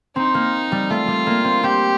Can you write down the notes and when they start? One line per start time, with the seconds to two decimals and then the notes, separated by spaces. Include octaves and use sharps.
0.16 C4 D#4
0.34 A#3
0.72 G3
0.90 A3 F4
1.08 G3
1.27 A#3
1.44 C4
1.63 C4 G4